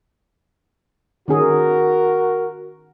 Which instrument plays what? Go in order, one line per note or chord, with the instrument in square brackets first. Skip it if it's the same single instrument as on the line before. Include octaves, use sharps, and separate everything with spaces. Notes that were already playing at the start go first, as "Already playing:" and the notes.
[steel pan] D#3 C#4 G#4 [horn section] F#4 A#4